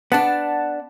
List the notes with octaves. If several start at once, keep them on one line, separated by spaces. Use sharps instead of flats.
B3 D4 F#5 A5